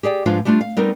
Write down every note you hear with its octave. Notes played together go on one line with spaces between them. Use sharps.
G4 G#4 D5 G5
G#2 F3 D4 F4 B4 F5
G3 A3 D4 D#4 F4
F5
G3 B3 C4 D#4 A#4